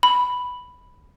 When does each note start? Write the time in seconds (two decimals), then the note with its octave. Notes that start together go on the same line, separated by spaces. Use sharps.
0.03 B5